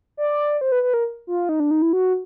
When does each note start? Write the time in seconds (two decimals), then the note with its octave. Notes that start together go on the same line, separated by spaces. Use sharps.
0.17 D5
0.61 C5
0.72 B4
0.83 B4
0.94 A#4
1.27 F4
1.49 D#4
1.60 D4
1.71 D#4
1.82 E4
1.93 F#4